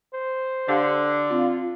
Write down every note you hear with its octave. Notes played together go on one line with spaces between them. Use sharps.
C5
D3 G4 F5 G5
C4 F4